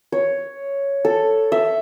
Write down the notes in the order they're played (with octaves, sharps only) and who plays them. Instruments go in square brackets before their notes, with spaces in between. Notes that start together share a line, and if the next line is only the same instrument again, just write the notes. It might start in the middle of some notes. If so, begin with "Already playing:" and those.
[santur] C#5
A4
E5